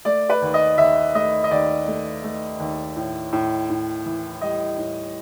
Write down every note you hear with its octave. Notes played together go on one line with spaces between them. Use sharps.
A3 D5
B4
D#2
D#5
D#2 E5
A3 D#5
D#5
D#2 D5
A3
A3
D#2
A2
A2
A2
E3
G3 D#5
A2